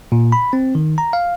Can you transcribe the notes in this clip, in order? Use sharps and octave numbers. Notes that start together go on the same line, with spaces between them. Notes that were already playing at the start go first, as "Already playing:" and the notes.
A#2
B5
C4
D#3
A#5
F5